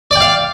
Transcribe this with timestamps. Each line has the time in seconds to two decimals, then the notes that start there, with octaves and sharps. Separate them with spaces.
0.11 D5
0.16 G5
0.20 F5